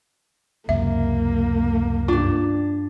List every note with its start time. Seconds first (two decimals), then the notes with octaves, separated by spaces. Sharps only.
0.69 C#2 F#2 C3 A#3 E5
2.08 G2 D4 F4